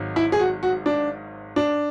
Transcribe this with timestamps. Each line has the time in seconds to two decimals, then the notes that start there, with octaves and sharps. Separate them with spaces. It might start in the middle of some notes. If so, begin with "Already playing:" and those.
Already playing: G#1 G#2 F#3
0.16 E4
0.32 G#4
0.39 F#4
0.63 F#4
0.86 D4
1.56 D4